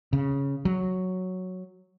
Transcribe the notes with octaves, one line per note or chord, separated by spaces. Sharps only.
C#3
F#3